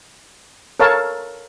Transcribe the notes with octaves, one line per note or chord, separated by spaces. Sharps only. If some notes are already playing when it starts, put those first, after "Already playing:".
A4 A#4 C#5 F5 A5